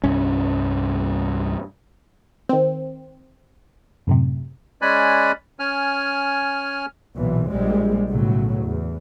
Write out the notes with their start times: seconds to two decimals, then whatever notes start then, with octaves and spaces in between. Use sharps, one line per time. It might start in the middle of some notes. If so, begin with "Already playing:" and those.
0.04 C2 G2 C#4
2.49 D#3 C4
4.07 F#2 A2 C3
4.82 G#3 C#4 D5 G#5 B5 F#6
5.59 C#4 G#5 F6
7.16 B1 A#2 E3
7.50 A#1 G3 G#3
8.09 B1 A2 C#3 F#3
8.63 E2